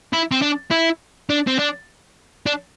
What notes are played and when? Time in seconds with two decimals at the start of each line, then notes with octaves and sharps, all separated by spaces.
0.13 E4
0.31 C4
0.42 D4
0.71 E4
1.29 D4
1.47 C4
1.59 D4
2.46 D4